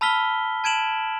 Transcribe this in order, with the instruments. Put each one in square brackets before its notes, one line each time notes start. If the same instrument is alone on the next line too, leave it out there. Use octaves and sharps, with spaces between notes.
[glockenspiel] A5 B5 E6 F6 B6 G7
A5 G#6 D7 E7 F#7